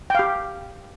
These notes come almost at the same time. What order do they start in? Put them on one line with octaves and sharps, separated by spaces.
G5 F5 G4